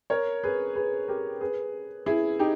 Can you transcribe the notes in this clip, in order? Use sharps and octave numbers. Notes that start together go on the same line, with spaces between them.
A#4 C#5
G#4 B4
G#4 B4
G4 A#4
G#4 B4
E4 G#4
D#4 G4